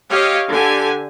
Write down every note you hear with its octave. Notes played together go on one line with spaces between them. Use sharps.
G4 C#5 D#5 F5
D3 G4 G#5